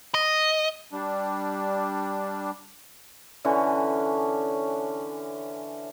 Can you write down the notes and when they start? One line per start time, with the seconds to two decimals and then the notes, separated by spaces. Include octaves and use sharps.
0.14 D#5
0.92 G3 D4
3.45 D3 E3 C#4 D4